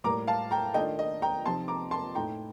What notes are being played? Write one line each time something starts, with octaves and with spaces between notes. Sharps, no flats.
A2 G3 A#3 A#5 D6
F5 A5
G5 A#5
D#3 A3 D4 F4 D#5 G5
D#5
G5 A#5
C3 F3 C4 D#4 A5 C6
A#5 D6
A5 C6
A2 A3 D#4 G5 A#5